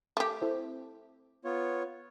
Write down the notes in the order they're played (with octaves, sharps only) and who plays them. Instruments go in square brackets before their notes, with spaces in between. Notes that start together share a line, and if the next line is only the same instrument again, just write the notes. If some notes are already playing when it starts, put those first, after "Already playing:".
[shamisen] A3 G4
[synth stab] C4 E4 A4
[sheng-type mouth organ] B3 F4 C#5